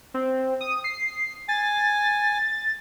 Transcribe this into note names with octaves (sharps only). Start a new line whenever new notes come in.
C4
D#6
C7
G#5 A6